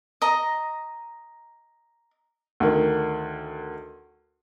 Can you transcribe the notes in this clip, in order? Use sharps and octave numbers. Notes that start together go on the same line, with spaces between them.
D#5 A#5
D2 D#3